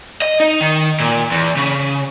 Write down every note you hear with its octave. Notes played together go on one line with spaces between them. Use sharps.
D#5
D#4
D#3
A#2
E2
C#3